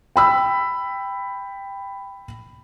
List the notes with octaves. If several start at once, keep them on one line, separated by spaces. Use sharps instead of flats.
G5 B5 E6